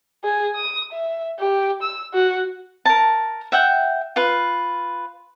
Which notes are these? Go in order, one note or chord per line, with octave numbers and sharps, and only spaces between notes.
G#4
D#6
E5
G4
E6
F#4
A#4 A5
E5 F#5 G5
F4 B4